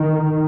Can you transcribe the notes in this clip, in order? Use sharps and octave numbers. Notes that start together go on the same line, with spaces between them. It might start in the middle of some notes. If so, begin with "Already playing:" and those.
Already playing: D#3